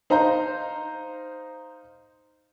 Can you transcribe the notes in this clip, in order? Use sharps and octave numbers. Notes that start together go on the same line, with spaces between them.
D#4 C5 F5 A#5